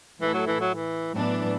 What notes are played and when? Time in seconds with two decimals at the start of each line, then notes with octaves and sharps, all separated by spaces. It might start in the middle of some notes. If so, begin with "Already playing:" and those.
0.20 A2 E3 A3 E4 A4
0.34 F#3
0.47 E3
0.61 F#3
0.75 E3
1.14 A2 E3 F#3 B3 D4